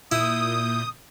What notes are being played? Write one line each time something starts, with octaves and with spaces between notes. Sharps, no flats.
A#2 E4 D#6 G6